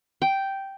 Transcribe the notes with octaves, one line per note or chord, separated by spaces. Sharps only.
G5